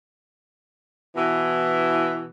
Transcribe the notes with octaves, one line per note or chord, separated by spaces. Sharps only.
B2 E3